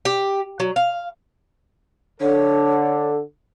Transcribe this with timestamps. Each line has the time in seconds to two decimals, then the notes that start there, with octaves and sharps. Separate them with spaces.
0.05 G4
0.60 F#3
0.76 F5
2.20 D3 A4 C#5